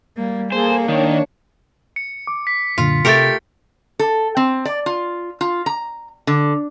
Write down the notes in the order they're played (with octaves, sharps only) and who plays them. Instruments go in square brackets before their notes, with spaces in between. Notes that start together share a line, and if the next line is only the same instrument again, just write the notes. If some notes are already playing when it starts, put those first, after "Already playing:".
[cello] G3 A#3
[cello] A#3 [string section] G#4 A4 [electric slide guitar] C5
[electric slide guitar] D#3 [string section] D4 C#5
[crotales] C#7
[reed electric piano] D6
[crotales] B6
[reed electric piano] F#2 A#2 D3 [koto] F4
[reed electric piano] C3 [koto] A3 G4 A#4 [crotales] A6 C#7
[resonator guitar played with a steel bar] A4
C4
D5
F4
F4
A#5
D3